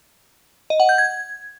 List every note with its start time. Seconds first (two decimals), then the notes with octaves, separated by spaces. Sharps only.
0.70 D#5
0.80 F#5
0.89 G6
0.98 G#6